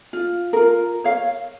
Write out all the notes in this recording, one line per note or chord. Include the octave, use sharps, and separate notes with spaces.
F4
F4 A#4
C#5 F5